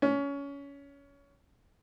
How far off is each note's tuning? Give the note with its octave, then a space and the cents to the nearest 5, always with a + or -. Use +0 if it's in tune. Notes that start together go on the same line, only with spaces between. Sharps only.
C#4 +20